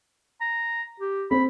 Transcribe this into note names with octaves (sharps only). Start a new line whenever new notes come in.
A#5
G4
C4 B5